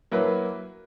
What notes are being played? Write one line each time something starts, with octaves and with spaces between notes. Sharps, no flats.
F#3 A#3 E4 B4